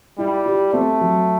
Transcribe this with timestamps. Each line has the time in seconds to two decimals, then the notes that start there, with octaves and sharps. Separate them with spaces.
0.18 G3 E4
0.46 G4
0.73 A3 C4
1.01 F#3